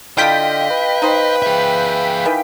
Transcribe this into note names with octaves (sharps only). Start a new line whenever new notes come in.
D3 D4 E4 F4 D#5 F5 G5 B6
B4
D#4 C5
G#4 E5
D#3 E3